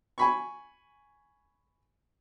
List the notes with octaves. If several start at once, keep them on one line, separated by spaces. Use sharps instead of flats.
G#5 B5 C#6